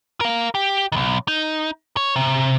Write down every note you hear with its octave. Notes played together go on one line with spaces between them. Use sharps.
A#4 F5
G4
B1 D#3
D#4
C#5
C3